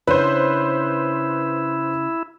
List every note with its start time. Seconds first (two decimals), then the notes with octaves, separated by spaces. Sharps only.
0.07 C#3 D4 E4 B4 C5